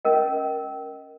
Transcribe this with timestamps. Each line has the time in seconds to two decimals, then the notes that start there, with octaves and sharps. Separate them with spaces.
0.05 C#4 A#4 D#5